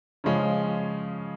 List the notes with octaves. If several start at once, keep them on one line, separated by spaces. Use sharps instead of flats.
C#3 F3 G#3 C#4